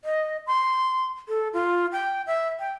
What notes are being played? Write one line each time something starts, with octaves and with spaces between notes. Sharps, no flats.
D#5
C6
A4
F4
G5
E5
G5